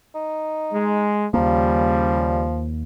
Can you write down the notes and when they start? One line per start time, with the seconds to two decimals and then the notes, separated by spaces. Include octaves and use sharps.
0.15 D#4
0.73 G#3
1.34 D#2 C#3 F3 G3 A#3